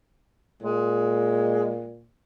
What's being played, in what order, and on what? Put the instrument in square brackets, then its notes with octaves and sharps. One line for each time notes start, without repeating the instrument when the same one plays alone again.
[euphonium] A#2 [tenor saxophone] G#3